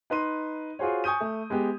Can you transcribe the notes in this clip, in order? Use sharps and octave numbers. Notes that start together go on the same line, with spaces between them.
D#4 B4 C6 D#7
F4 F#4 G#4 C5 C#5
G#5 C#6 D#6 G6 D#7
A3
G#3 B3 G4